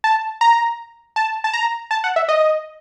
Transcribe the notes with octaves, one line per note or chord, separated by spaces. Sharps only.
A5
A#5
A5
A5
A#5
A5
F#5
E5
D#5